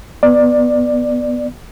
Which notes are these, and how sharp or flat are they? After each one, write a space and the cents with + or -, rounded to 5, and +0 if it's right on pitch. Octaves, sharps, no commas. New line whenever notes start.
B3 +0 D5 +15